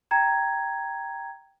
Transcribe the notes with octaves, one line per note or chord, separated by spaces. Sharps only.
G5 A#5 G#6